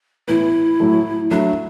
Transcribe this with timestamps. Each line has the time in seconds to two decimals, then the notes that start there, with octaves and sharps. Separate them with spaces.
0.28 A2 E3 B3 E4
0.80 A2 F#3 A3
1.31 F#3 A3 D4 E4